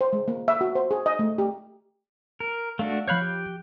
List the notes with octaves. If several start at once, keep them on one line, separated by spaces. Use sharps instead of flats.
C5
G#3
A#3
E5
F#4
C5
G#4
D#5
A3
G4
A#4
A3 D4 F#4 F5
F3 C#5 F5 B5 F#6 G6
G4